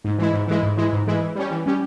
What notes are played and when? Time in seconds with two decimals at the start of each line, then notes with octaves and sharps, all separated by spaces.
0.04 G#2
0.18 E3 G#3 E4
0.33 G#2
0.48 E3 G#3 E4
0.63 G#2
0.77 E3 G#3 E4
0.93 G#2
1.07 E3 G#3 E4
1.21 E3
1.36 G3 C#4 G4
1.51 E3
1.66 G3 C#4 G4